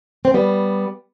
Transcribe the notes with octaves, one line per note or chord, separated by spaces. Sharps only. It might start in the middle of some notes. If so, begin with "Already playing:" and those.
C4
G3 B3